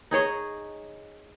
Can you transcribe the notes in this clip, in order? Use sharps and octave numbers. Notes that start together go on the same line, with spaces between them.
D#4 G#4 C#5 D#5